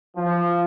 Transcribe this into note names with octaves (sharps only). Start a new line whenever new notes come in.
F3